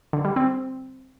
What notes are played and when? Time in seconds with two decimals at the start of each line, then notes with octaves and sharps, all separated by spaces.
0.13 D3
0.25 G3
0.36 C4